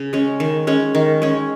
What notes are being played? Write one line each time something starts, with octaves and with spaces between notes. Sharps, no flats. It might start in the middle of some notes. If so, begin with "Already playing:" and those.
Already playing: C#3
G#3 C#4
D#3
G#3 C#4
D#3
G#3 C#4